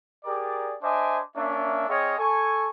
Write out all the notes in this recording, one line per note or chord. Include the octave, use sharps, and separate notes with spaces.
G4 G#4 A#4 D5
D4 C5 D#5 E5 G#5 D6
A#3 C#4 D4 E5
C4 G#4 C#5 D#5 F5 D#6
A4 G#5 C#6